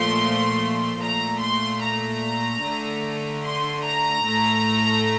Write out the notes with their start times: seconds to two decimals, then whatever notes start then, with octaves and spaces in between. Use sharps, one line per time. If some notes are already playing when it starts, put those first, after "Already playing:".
Already playing: A#2 F3 A3 C6
1.01 A#2 A3 A#5
1.41 C6
1.83 A#5
2.63 D3 A3
3.44 C6
3.85 A#5
4.25 A2 A3